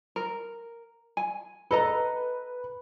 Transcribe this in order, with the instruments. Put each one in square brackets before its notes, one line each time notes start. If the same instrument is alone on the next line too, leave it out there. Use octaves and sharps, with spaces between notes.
[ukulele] A#4
G#5
[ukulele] A4 D#5 A#5 [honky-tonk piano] B4